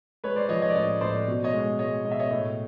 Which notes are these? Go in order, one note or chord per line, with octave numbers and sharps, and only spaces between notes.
G#3 B4 C#5
C5 D5
F3 C#5 D#5
C#5 D#5
D5
A2 C#5 D#5
A2 C5 D5
B2
C#5 D#5
G#3
G#3 C#5 D#5
B2 D#5
E5
C#5 D#5
A2 C#5 D#5